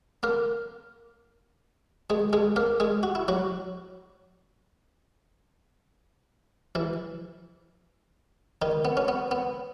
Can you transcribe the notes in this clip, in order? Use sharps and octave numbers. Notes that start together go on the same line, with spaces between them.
A#3 A#4
G#3 G#4
G#3 G#4
A#3 A#4
G#3 G#4
F#4
E4
F#3 F#4
E3 E4
D#3 D#4
B3
C#4
B3
B3